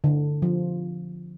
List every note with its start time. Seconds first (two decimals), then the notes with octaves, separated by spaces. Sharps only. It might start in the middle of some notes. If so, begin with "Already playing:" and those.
0.04 D3
0.42 F3